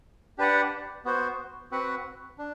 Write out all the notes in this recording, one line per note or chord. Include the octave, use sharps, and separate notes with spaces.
D4 G4 B4 D5 F#5
B3 F#4 C5
C4 F#4 B4 F#5
D4